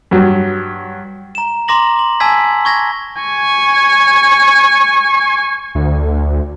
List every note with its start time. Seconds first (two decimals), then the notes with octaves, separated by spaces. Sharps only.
0.11 G2 F#3
1.35 A#5 E7
1.68 A#5 C6 D6 A#6 F#7
1.99 F#7
2.20 G#5 A5 E6 G#6 B6
2.65 C#6 G#6 A#6
3.21 G#5 C#6
5.75 D2